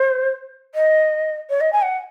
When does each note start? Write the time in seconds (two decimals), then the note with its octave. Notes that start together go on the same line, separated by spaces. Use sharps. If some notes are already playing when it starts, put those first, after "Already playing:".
Already playing: C5
0.74 D#5
1.50 C#5
1.60 D#5
1.72 G#5
1.82 F#5